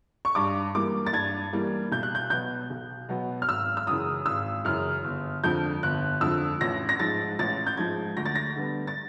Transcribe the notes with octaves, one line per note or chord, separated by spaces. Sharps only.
C#6
G2 D6
E3 G3 A#3 D6
A6
G2 G#6
E3 G3 A#3
B1 G6
F#6
G6
B2 F#3 B3 G6
B1
B2 F#3 B3
F6
G#1 E6
E6
F#2 C#3 E3 D#6
G#1 E6
F#2 C#3 E3 F6
G1
F2 D3 F3 G6
G1 F#6
F2 D3 F3 E6
A1 A#6
A#6
G#2 F3 G#3 A6
A1 A6
G6
G#2 F3 G#3 G#6
D2 A#6
A6
A#6
D3 G3 B3
A6